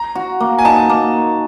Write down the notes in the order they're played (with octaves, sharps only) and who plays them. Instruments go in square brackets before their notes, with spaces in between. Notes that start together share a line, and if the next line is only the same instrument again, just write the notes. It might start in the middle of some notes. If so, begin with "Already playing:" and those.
Already playing: [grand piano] A#5
[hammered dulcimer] F#4
A#3
[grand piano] G#5
[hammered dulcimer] D#4 [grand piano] A5
[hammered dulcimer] A#3